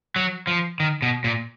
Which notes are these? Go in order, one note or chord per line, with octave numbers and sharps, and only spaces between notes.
F#3
F3
D#3
B2
A#2